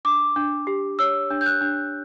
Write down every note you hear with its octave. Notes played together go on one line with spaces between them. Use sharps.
D4 D6
D4
G4
C#5 E6
D4
G6
F#6
D4